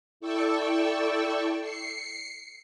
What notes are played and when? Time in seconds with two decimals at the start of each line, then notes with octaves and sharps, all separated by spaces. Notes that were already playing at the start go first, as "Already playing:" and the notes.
0.20 E4 A4 D5 G5 C#6 E6
1.61 C7 C#7